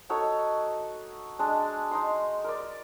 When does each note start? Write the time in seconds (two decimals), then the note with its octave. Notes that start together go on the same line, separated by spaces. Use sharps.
0.10 D#4 F#4 A4 C#5
1.39 G#3 D4
1.91 D#4 A#5 C6
2.44 A#4 D5